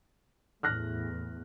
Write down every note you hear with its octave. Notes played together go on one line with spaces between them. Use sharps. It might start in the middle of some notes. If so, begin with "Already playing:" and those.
E2 A2 F6 F#6 A#6